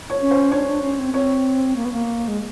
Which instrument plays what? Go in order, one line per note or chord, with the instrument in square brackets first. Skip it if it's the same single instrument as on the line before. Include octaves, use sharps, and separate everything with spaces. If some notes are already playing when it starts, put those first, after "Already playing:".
[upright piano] C#5
[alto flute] C#4
[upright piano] C5
[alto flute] D4 [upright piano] C#5
[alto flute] D4
C#4
C4
[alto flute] C4 [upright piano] C#5
[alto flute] A#3
B3
A#3
G#3